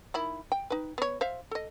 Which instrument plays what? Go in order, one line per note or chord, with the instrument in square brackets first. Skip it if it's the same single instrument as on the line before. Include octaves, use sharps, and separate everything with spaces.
[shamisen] D#3 E4 B5
G5
D#4 B4
B3 C#5
C5 E5 F5
A4 D#5